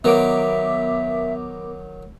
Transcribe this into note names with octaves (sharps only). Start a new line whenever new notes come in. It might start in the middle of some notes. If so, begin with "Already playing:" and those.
D#3 F#3 B3 A#4 E5 D6